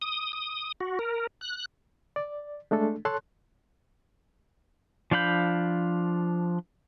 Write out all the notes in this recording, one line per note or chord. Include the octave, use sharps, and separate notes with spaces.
D#6
D#6
F#4
A#4
F#6
D5
G#3 A3 D4 A4
A4 C#5 A5 C6 F#6
F3 D4 F5 B5 G6